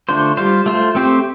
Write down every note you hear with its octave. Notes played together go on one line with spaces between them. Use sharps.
D3 A3 D4 F4 C5
G3 F4 C5
A3 F4 C5
A3 C4 G4 C5